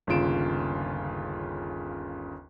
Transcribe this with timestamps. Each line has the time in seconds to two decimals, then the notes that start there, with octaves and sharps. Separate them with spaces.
0.07 G1 D#2 C#3 F4 D7 E7